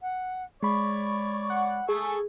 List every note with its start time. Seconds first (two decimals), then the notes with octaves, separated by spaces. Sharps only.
0.01 F#5
0.63 G#3 C#5 D5 B5 C#6
1.50 F#5
1.89 G#4 A4 C#6 E6